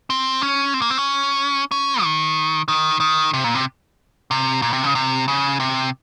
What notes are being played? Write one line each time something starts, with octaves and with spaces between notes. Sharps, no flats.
C4
C#4
C4
A#3
C4
C#4
C#4
D#3
D#3
D#3
C3
A#2
C3
C3
A#2
C3
C#3
C3
C#3
C3